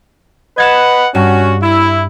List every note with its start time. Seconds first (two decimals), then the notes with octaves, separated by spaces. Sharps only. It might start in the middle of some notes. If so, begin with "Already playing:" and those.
0.58 B4 D#5 F#5 G#6 A6 E7
1.15 G2 C#4 F#4
1.63 E4